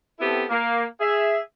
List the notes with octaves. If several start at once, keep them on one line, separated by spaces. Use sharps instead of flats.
B3 C4 E4 G4 A4
A#3
G#4 E5